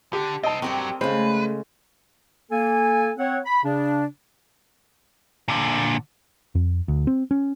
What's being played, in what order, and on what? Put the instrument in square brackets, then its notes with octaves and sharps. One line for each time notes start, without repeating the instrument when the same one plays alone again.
[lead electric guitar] D3 [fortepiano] G4
[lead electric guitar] C2 C4 [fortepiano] D#5 A5
[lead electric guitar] G2 F#3 [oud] G3 G4 [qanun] C4 A#4
[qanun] C#3 G#3 [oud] A3 [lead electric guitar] B4 [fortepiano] C5
[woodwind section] A#3 A4 G#5
C4 C#5 F#5
B5
C#3 D4
[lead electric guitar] A#2 D3
[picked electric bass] F2
D2
C4
C#4